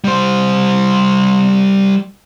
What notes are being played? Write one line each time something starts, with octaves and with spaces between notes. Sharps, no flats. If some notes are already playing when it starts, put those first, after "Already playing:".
G3 C5